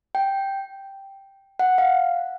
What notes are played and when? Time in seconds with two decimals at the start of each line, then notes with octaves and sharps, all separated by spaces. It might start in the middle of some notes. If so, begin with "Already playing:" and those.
0.15 G5
1.59 F#5
1.78 F5